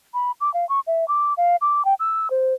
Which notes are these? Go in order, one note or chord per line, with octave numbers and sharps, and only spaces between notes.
B5
D6
F5
C#6
E5
D6
F5
D6
G5
E6
C5